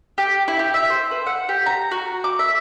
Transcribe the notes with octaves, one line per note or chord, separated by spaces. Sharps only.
G4
E4
G4
E5
C5
B4
F#5
G4
A#5
F#4
D6
E5